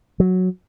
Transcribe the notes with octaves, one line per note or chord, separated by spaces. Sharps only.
F#3